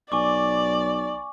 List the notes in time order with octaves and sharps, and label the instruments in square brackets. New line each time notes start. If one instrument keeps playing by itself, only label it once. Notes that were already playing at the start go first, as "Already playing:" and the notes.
[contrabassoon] B1 [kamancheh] D5 [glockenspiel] G#5 C#6 D6